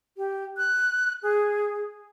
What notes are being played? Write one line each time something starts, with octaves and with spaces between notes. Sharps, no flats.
G4
F#6
G#4